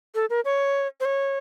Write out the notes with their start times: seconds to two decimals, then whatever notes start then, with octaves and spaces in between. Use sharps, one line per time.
0.15 A4
0.30 A#4
0.45 C#5
1.00 C5
1.05 C#5